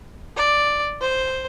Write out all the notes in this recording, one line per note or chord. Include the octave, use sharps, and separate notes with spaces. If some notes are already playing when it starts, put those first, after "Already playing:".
D5
C5